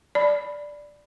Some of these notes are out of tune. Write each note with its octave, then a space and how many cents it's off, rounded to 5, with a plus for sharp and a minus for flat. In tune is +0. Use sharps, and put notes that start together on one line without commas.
D5 +0 B5 +0